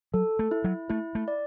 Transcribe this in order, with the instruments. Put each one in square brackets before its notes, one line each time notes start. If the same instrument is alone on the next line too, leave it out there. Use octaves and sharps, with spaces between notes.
[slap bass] F#3 [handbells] A4
[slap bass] A3
[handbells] E4
[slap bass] F#3
[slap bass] A3 [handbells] E4
[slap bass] A3
[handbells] D5